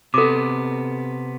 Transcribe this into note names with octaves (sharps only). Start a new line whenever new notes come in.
C3 B3 A4 D6